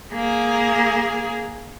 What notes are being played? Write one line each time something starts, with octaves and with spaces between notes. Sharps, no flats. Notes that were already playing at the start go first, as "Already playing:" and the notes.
A#3 G#4